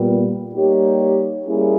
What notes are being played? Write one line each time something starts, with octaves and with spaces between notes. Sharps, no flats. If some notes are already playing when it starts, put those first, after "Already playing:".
Already playing: A#2 G3 B3
G3 A#3 D#4 G4 C#5
G3 A#3 C#4 E4 G#4